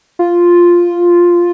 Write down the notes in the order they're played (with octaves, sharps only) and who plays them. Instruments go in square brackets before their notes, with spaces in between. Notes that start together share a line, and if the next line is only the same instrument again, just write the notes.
[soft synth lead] F4